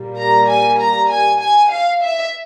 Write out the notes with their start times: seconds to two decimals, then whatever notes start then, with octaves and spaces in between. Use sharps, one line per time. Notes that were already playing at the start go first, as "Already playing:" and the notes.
Already playing: A#2 G3 A#3
0.17 A#5
0.48 G#5
0.79 A#5
1.10 G#5
1.40 G#5
1.71 F5
2.02 E5